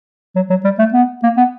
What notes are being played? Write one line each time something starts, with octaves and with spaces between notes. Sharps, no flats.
F#3
F#3
G3
A3
B3
A#3
B3